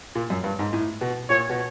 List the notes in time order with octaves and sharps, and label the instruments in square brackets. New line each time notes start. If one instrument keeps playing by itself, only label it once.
[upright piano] A#2
F#2
G2
G#2
A2
B2
[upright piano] A#2 [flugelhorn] C#5
[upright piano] B2